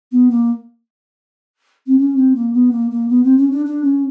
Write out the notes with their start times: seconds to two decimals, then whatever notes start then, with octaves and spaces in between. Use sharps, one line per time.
0.12 B3
0.30 A#3
1.87 C4
1.99 C#4
2.17 C4
2.35 A#3
2.54 B3
2.72 A#3
2.91 A#3
3.09 B3
3.24 C4
3.38 C#4
3.51 D4
3.66 D4
3.84 C#4